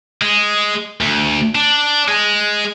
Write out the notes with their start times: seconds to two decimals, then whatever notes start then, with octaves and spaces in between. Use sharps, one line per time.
0.21 G#3
1.01 D2
1.55 D4
2.08 G#3